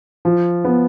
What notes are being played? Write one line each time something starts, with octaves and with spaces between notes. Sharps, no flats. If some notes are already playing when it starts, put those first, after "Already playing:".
F3
B3